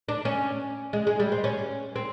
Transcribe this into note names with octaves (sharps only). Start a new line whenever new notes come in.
D4
C#4
G#3
G#3
G3
C4
C#4
C4